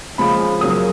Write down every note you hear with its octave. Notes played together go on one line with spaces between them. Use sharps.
C#3 F3 G#3 B5
C#3 F#3 A#3 D#6